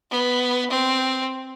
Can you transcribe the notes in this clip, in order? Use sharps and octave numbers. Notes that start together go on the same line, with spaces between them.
B3
C4